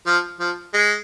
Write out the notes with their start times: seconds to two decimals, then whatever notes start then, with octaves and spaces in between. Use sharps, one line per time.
0.07 F3
0.40 F3
0.74 G#3